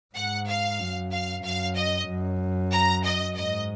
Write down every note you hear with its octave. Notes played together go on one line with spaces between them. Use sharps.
G#2 F#5
F5
F#2
F5
F#2 F5
D#5
F#2
A#5
D#5
G#2 D#5